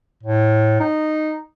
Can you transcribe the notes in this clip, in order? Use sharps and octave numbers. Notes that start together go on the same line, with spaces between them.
A2
D#4